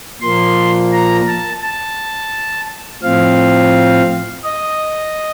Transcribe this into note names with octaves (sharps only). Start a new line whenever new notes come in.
A#2 F3 A#3 C6
A#5
A5
A5
A2 F3 C4 F5
D#5